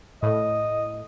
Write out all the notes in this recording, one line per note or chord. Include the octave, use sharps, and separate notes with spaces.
A2 A3 D#5